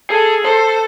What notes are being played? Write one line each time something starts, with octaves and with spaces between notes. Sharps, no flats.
G#4 A4
A4 C5